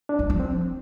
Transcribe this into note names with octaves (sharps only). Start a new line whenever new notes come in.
D4
E3
F3
C4